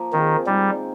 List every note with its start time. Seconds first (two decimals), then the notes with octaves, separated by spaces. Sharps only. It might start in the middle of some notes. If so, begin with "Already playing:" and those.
Already playing: F3 A#3
0.13 D#3 C4 F4 G#4
0.47 D#3 G3 G#3 C4